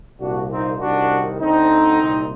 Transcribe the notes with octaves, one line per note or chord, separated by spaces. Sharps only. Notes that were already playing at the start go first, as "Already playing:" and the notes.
C2 A#2 D4 F#4
C4 D#4
C2 C3 D#3 D4 F#4
D2 D3 C4 D#4
C2 A#2